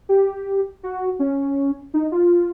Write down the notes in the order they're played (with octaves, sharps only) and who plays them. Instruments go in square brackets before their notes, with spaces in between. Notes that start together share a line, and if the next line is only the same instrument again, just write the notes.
[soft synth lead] G4
F#4
C#4
D#4
F4